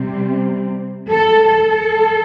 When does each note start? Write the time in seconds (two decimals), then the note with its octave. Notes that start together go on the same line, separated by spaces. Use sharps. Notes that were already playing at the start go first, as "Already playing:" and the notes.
Already playing: C3 G3 C4
1.10 A4
1.47 A4